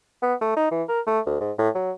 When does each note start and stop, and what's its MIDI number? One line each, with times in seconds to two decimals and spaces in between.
0.22 0.34 59
0.41 0.56 57
0.56 0.67 63
0.71 0.83 52
0.88 1.00 70
1.07 1.20 57
1.26 1.40 38
1.40 1.51 44
1.58 1.69 45
1.75 1.91 54